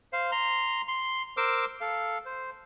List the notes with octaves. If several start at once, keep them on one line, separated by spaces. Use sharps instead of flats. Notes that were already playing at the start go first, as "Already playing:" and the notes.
C5 F5
A#5 C6
C6
A#4 C5 D6 E6
A4 F5
C5